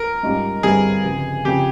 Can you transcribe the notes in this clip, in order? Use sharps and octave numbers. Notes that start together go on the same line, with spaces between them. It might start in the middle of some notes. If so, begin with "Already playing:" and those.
Already playing: A#4
G#2 G3 C#4 F4
G1 G2 G3 C4 E4 G#4
G1 F2 C#3
F2 C#3 F3 G4